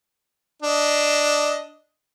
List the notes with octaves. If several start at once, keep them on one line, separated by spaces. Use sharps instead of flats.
D4 D#5